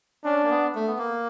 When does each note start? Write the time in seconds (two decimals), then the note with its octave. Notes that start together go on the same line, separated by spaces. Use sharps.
0.25 C#4 D4
0.44 A#3
0.50 B3
0.75 A3
0.88 B3
0.98 A#3